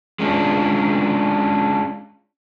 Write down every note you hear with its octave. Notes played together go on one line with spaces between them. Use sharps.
G#3 C#4 D4 F4